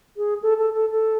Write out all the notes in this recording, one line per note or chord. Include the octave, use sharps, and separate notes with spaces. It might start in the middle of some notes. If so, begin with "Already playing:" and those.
G#4
A4
A4
A4
A4